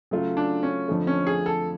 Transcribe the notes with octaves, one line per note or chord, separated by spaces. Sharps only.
C#3 F#3 A3 F4
D4
C#4
F2 D3 F3 A3
C#4
G#4
A4